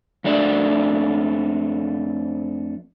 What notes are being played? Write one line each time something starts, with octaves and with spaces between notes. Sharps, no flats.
F2 A3 D4 D5